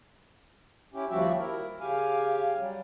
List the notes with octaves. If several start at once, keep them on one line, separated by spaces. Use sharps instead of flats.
C#4 E4 G4
D#2 F3 G3 F#4 G4 E5
E4 A#4
C#3 G4 F5 G#5
F#3 G3